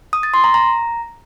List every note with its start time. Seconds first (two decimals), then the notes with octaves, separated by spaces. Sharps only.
0.13 D#6
0.23 A6
0.34 C6
0.44 A#5
0.54 A#5